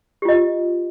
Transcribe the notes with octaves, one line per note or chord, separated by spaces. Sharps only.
F4 G4 D#5